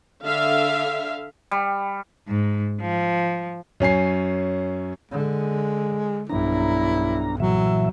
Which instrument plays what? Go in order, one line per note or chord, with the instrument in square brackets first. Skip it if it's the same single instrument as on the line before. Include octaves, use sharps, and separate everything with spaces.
[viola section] D3 E5 F5
[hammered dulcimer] G3
[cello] G#2
F3
[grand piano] F#2 C#4 G#5 C7
[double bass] D3 [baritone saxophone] G#3
[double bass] B1 G2 [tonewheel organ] D4 A#5 [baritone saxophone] E4
[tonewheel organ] A#2 E3 E5 [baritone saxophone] F#3